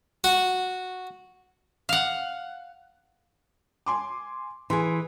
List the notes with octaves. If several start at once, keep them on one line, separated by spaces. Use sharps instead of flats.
F#4
F5 F#5
G#5 C6 D6
E3 G#4 C6